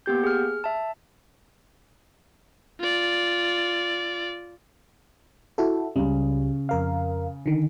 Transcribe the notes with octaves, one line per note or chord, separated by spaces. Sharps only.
A#3 B3 G4 G6
G#4 F6
E5 A5
F4 D5
E4 F#4 A4
C#2 C#3 G3
F2 A#4 F5
D3 D#3